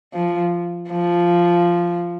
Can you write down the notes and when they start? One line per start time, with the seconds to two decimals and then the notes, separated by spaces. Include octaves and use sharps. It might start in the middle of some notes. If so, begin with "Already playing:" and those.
0.13 F3
0.90 F3